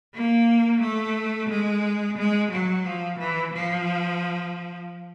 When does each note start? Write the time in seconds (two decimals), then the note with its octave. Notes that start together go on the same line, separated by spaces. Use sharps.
0.14 A#3
0.82 A3
1.49 G#3
2.18 G#3
2.52 F#3
2.85 F3
3.19 E3
3.53 F3